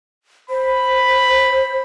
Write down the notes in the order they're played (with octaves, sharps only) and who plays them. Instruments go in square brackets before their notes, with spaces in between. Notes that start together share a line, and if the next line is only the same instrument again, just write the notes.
[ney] C5 [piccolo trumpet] B5